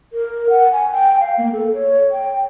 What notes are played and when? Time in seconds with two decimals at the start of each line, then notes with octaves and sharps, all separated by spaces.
0.13 A#4
0.49 F#5
0.72 G#5
0.92 G5
1.20 F5
1.38 A#3
1.53 A4
1.74 C#5
2.11 G5